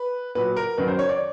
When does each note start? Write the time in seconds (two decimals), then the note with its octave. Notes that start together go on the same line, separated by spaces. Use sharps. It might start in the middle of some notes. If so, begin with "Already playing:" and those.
Already playing: B4
0.35 A#2 F#3 B4
0.57 A#4
0.78 F#2 D#3 F#3 B4
0.88 C5
0.99 C#5
1.09 D5